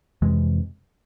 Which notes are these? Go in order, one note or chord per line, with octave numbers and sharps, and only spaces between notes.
F2 C3 E3 G#3